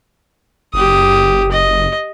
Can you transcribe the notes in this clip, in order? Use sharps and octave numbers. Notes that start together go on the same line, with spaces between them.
F#1 G4 D#6
D#5